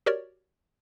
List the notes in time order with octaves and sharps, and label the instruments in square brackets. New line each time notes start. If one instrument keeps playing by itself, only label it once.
[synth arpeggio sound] F#4 G4 A#4 C#5 D5